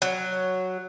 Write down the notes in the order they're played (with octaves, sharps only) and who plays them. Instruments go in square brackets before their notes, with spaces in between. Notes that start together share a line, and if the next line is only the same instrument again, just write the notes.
[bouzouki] F#3